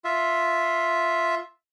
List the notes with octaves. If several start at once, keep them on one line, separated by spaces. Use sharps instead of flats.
F4 E5